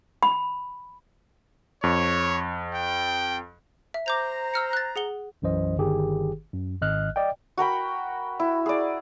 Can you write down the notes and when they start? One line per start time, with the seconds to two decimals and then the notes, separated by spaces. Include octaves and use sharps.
0.23 B5
1.84 F2 C#5
2.75 G5
3.94 E5
4.06 C5 A#5 D6 G6 F7
4.54 E6 F6 C#7
4.73 F#6 A6
4.96 G#4 F#5 G7
5.42 B1 F#2 E3 C5 D#5
5.78 G1 D#3 G4 G#4
6.53 F#2
6.82 G#1 D#5 F6 F#6
7.16 D5 D#5 G5
7.57 F#4 A#4 G5 B5
8.40 E4
8.66 G#4 D5